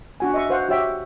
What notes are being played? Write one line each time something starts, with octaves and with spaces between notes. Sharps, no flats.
D4 F#4 G#5
D#5 E5 C#6
F#4 B4 C5 F5 F#5
F#4 G4 C#5 E5 G5